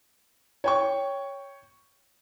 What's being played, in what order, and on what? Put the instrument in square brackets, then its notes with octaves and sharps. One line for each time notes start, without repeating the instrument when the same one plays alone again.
[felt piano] C#5 G5 C#6